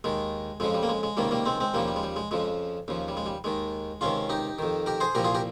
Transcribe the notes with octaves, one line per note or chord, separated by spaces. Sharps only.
D#2 D#3 G#3
F2 C#3 F3 G#3
G3
A#3
G#3
G#3
C#2 C3 D#3 G3 A#3
G3 A#3
G#3 C4
G#3 C4
D#2 C#3 F3 G3 A#3
G3
G#3
G3
G#3
F2 C#3 F3 G#3
D#2 C#3 F3
G3
G#3
G3
D#2 D#3 G#3
C#2 C3 D#3 C#4 F4
D#4 G4
F2 D#3
G4 A#4
G#4 C5
C2 A#2 F3 G4 A#4
F4 G#4
G4 A#4